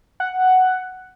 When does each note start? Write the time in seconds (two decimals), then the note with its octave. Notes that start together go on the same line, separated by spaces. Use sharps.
0.20 F#5